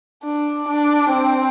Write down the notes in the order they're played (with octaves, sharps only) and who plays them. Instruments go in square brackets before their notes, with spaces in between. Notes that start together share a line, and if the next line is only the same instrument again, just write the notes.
[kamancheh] D4
D4
C4